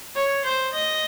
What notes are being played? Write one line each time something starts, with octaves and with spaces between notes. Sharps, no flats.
C#5
C5
D#5